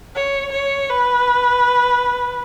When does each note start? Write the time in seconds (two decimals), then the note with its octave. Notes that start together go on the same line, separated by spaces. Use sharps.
0.15 C#5
0.52 C#5
0.89 B4